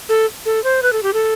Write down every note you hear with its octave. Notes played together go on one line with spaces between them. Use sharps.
A4
A4
C5
B4
A4
G4
A4